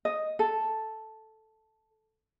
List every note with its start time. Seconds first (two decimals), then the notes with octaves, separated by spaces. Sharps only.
0.05 D#5
0.39 A4